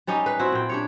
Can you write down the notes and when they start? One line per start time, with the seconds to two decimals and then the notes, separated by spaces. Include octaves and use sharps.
0.07 G3 C#4 D#4 G4
0.26 B4
0.39 C4 E4 F#4
0.52 A#2 G5
0.69 D4 G4 C#5